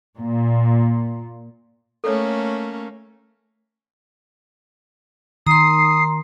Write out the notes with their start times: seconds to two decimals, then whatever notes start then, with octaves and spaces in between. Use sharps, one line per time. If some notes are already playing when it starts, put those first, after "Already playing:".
0.18 A#2
2.04 A3 A#3 C#4 A4 C#5
5.47 D#3 A#5 C6 D#6 C7